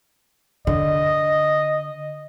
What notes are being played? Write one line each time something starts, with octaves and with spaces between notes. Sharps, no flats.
D3 D#5